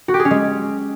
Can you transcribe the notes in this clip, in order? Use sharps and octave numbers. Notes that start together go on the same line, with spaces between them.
F#4
G4
G#4
C#4
G#3